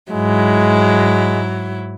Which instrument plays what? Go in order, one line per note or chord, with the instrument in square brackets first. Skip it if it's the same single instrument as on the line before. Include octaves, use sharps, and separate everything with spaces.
[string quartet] G#2 F#3 E4 [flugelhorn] G#3